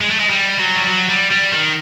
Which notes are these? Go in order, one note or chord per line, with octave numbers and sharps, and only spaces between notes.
G#3
A3
G#3
G3
F#3
G3
F#3
G3
G3
D#3